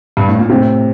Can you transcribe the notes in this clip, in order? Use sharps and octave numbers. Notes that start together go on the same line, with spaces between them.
G2
A2
A#2
A2 C3